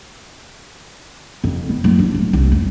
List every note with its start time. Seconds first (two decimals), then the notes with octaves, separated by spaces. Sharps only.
1.44 F2
1.69 B3
1.84 F#1
1.99 D4
2.14 D1
2.33 C2
2.52 F2